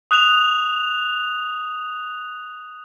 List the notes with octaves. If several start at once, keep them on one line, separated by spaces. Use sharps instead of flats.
D#6 F#6 E7 F7